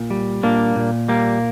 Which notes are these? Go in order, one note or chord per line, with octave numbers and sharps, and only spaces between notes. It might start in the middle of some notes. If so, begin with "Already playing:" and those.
Already playing: A#2
G3
A#2 A#3 D4
A#2
G3 A#3